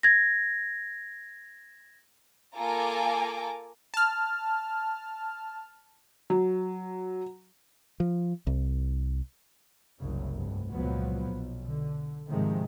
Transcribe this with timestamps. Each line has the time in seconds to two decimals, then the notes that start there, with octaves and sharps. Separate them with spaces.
0.03 G#6 A#6
2.55 A#3 F4 A4 G#5 A#5 D6
3.94 A5 F6
6.30 F#3
8.00 F3
8.47 C2
9.99 F#1 C2 F#2 C#3
10.34 F1 G2
10.71 C#2 A#2 F3 F#3 B3
11.31 B1
11.66 D3
12.30 G#2 C3 D#3 F3 G#3